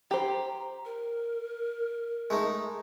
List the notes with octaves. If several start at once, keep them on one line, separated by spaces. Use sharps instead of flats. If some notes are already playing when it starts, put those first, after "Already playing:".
G4 C5 A#5
A#4
G#3 A3 D#4